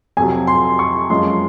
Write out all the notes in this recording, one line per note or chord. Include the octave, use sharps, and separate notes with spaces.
F2 C3 F#3 G#5
C6
C#6
F#2 F3 G#3 C6